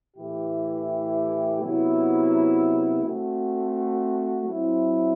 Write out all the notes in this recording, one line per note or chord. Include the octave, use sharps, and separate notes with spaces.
A2 E3 A3 E4 G4
C3 F#3 B3 E4
A3 C4 F#4
F#3 C4 E4